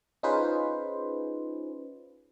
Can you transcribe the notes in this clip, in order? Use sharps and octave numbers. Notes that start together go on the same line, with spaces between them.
C#4 D#4 F4 G#4 B4 C5